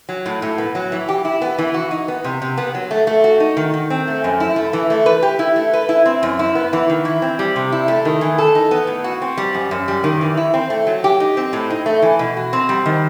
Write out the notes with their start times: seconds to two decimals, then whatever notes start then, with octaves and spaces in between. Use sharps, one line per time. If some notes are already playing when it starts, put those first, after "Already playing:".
0.09 F#3
0.26 A2
0.42 A2
0.58 B3
0.75 F#3
0.92 E3
1.09 G4
1.25 E4
1.41 B3
1.58 E3
1.74 F#4
1.91 D#4
2.08 B3
2.24 C3
2.42 C3
2.57 B3
2.75 F#3
2.91 A3
3.07 A3
3.24 F#4
3.40 D#4
3.57 D#3
3.74 D#3
3.90 C4
4.07 A3
4.24 F#2
4.40 E4
4.56 A3
4.73 E3
4.90 A3
5.06 B4
5.22 G4
5.39 E4
5.56 A3
5.73 B4
5.89 E4
6.06 C4
6.23 F#2
6.39 E4
6.55 B3
6.73 E3
6.90 D#3
7.05 E4
7.22 C4
7.39 G3
7.56 C3
7.72 E4
7.88 A3
8.05 D#3
8.21 E3
8.38 A4
8.55 D#4
8.71 B3
8.87 A2
9.04 F#4
9.22 C4
9.37 G3
9.54 F#2
9.71 F#2
9.88 G3
10.04 D#3
10.21 E3
10.37 E4
10.54 C4
10.70 A3
10.87 F#3
11.04 G4
11.20 D#4
11.37 C4
11.53 A2
11.70 D#4
11.86 A3
12.02 E3
12.19 B2
12.37 F#4
12.53 C4
12.69 G3
12.86 D#3